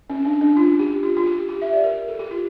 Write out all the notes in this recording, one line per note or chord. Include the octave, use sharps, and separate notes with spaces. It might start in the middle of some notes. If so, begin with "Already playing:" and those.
C#4
D4
D4
F4
G4
F4
F4
G4
G4
E5
D5
A#4
A4
G4
F4